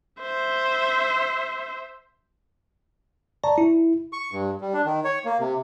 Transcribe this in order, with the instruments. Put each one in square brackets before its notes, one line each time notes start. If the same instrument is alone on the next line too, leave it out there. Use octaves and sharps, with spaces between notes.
[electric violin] C5 E5
[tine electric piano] D5 A5 A#5 C#6
E4
[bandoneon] C#6
G2
G3
D4
D#3
C#5
A#3
C3